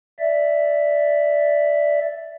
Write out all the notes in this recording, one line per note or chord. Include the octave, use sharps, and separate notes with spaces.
D5 E5